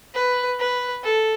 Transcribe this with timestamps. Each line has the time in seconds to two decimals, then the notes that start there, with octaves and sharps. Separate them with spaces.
0.14 B4
0.59 B4
1.04 A4